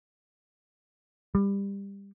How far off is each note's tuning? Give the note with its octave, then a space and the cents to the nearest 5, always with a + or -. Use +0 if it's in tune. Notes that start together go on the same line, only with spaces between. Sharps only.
G3 +20